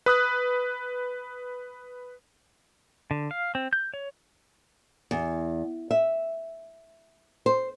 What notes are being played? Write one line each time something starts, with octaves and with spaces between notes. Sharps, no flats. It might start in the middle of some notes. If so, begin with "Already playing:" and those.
B4 D#6 F#6
D3
F5
C4
G6
C#5
E2
E5
C5